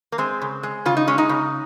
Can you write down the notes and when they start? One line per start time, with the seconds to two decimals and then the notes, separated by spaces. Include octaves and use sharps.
0.12 A#3
0.18 G#3 C4
0.42 C#3
0.63 G#3
0.86 C#3 F4
0.97 D#4
1.08 G#3 C#4
1.18 D#4
1.29 C#3